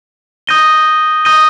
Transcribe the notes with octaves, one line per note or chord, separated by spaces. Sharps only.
D#6 G6 A#6 D#7 G7
D#6 G6 A#6 D#7 G7